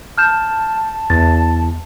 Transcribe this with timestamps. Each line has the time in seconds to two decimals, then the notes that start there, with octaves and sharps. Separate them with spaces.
0.18 A5 F6 G6 E7
1.10 E2 A6